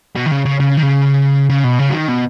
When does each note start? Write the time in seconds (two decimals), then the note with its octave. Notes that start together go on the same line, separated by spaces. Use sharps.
0.15 B2
0.26 D#3
0.31 C#3
0.45 C#3
0.60 C#3
0.77 D#3
0.83 C#3
1.50 C#3
1.64 B2
1.79 C#3
1.90 F#3
1.94 D#3
2.08 B2